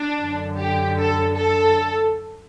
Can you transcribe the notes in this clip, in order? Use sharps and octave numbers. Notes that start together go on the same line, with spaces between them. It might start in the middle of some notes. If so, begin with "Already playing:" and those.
Already playing: D4
F#2 D3
G4
A4
A4